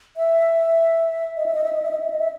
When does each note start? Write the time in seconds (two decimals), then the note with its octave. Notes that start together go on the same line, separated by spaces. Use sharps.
0.17 E5
1.37 D#5
1.46 E5
1.55 D#5
1.64 E5
1.73 D#5
1.82 E5
1.91 D#5
2.00 E5
2.10 D#5
2.19 E5